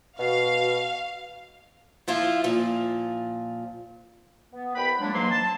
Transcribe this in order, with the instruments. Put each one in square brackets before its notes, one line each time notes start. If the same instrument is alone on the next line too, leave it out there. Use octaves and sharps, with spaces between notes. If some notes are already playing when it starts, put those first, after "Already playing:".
[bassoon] B2 [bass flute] F#4 [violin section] F5
[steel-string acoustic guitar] F3 E4 F4
A#2 F3
[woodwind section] B3
C2 B4 G5 B5
F3 F#3 G#3 A#3 D4
G#2 E3 F#3 A#3 C6
A5